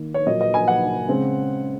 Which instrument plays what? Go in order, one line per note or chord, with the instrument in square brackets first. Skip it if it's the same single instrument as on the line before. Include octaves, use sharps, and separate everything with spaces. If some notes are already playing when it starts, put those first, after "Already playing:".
Already playing: [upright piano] D#3 A#3
C#5
A#2 F#3 A#3 D#5
D#5
G#5
F#5
C#3 G#3 C4